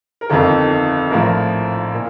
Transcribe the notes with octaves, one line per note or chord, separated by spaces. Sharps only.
A#4
G1 F2 D#3 A4
A#1 A2 F3 A#4
A#2